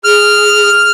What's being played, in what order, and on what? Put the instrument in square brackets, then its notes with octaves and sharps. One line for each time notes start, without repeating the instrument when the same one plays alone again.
[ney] G#4 [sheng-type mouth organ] F6